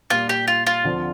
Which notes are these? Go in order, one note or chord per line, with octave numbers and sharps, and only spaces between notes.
A#2 G3 A#3 F4
G4
F4
F4
D2 D3 F3 C4